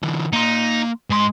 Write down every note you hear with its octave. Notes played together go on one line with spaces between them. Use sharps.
D3 E3
A#3 D#4 C6
G#2 G#3 C6